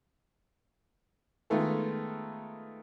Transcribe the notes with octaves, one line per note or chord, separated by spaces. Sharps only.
D#3 G#3 A3 B3 F4 A4